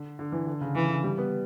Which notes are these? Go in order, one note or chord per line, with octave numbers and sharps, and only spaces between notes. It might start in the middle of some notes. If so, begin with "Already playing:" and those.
Already playing: D3
D3
E3
D3
C#3
C#3 E3
D3
G3
B3